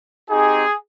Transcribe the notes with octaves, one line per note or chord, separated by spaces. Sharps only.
C4 D#4 G4 G#4